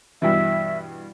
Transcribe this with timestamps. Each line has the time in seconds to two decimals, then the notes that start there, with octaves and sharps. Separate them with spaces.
0.22 G2 B2 E3 E5